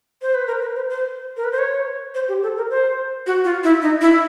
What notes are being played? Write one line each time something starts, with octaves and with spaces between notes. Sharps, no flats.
C5
B4
A#4
B4
C5
C5
A#4
B4
C5
C#5
C5
G4
A4
A#4
C5
F#4
F4
E4
D#4
E4